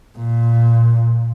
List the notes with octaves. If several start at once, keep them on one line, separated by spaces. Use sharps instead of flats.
A#2